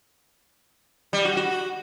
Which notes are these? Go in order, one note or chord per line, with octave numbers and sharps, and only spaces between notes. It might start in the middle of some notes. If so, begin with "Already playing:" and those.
G3
F#4
F#4